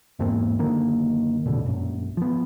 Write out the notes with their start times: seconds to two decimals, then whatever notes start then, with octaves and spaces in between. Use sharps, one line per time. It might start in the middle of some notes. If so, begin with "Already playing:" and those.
0.19 E2 G#2 A#3 C4
0.59 F#1 D3 D#3 A#3
1.46 A1 F2 B2 D3
1.66 A#1 F#2
2.17 F3 B3